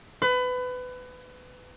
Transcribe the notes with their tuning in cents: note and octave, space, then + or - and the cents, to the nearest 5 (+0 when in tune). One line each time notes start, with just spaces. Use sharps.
B4 +25